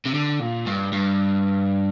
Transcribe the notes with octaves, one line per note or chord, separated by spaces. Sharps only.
C3
D3
A#2
G2
G2